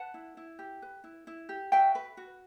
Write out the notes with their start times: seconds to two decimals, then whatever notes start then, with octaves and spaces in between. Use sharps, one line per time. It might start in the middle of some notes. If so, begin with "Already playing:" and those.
Already playing: B4 F#5 A5
0.14 E4
0.37 E4
0.59 G4
0.82 B4
1.04 E4
1.27 E4
1.49 G4
1.72 F#4 E5 G5
1.95 B4
2.17 F#4